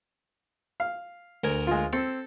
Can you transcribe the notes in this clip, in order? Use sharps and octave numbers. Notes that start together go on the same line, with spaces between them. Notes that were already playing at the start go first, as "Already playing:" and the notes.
F5
D2 A#4 G#5
G#3 F4
C4 A4